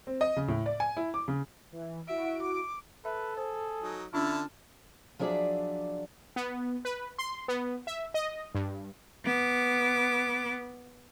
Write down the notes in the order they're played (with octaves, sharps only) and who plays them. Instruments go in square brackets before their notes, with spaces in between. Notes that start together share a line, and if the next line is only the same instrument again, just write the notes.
[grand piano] C4
D#5
C#3
A2
D5
G#5
E4
D6
C#3
[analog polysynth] E3
[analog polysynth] E4 F#4 D7 [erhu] E5
[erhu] D6
[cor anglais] A4 [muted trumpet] B4 [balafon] E5
[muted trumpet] G#4 [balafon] C5
[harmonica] F#3 D#4
[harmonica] D3 A5 F6 [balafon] C#4 D4 F4 [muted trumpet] E4
[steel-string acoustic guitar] F3 F#3 D4 G#4 D5 E5
[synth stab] B3
B4
C6
B3
E5
D#5
G2
[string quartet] B3 D6